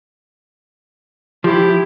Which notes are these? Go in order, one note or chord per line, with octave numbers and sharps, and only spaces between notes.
F3 E4 G4